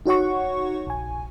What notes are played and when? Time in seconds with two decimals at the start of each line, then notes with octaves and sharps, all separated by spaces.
0.06 D#4 F#4 C#5 F#5 C#6
0.87 A#1 G#5